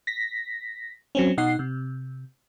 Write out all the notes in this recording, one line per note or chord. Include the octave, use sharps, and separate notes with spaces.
A#6 B6
F#3 C4 C#4
B2 D#4 F#5 C7
C3